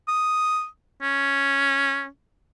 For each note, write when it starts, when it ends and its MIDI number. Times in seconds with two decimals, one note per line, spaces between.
0.08 0.66 87
1.02 2.06 61